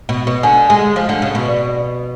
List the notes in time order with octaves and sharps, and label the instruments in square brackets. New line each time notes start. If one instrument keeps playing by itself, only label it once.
[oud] B2
B2
[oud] D3 [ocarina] G#5
[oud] G#3
F3
D3
C#3
B2
[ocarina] D5